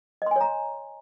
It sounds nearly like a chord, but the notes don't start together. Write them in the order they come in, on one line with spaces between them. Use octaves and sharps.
D#5 C6 G#5 C#5 A#5